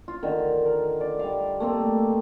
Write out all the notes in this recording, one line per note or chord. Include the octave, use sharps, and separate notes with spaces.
F4
D3 D#3
A#4
D5
G3 F5
A3 A#3 C4